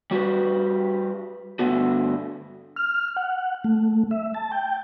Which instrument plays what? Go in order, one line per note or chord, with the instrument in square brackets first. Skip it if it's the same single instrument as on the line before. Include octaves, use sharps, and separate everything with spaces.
[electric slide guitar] G3 F#4 G4 B4
G2 D3 F3 A3 B3 F#4
[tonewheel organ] F6
F#5
A3
E5
A5
G5